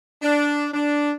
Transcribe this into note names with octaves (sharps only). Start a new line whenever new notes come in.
D4
D4